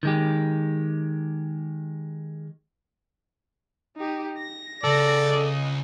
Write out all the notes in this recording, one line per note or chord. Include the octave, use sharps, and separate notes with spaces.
D#3 G#3 G4
D#4 G4
A#6
C#2 A4 D5
D#5